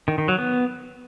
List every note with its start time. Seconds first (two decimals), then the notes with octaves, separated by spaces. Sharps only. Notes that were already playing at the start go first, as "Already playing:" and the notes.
0.08 D#3
0.18 D#3
0.28 F#3
0.38 B3